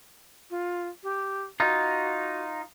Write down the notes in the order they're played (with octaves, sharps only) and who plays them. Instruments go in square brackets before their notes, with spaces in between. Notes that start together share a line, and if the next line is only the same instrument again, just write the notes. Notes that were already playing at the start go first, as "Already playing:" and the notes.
[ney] F4
G4
[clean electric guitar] D#4 F4 [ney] F#4